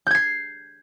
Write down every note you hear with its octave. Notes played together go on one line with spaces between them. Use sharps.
G6 G#6 C7